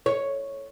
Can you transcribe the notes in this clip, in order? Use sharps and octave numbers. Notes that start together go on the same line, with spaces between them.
C#5